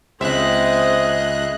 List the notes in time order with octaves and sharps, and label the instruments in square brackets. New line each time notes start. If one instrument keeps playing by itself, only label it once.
[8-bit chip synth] C#2 F#6 [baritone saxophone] C4 [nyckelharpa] G#4 D#5 [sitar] E5